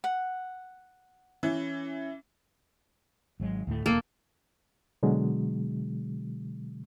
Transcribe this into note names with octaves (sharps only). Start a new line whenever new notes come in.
F#5
E3 C#4
G#1 F#3 G#3
D2 A2 A3
E1 A#3 A4
B2 D3 F#3 G#3